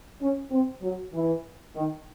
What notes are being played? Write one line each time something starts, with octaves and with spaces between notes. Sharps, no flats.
C#4
C4
F#3
E3
D#3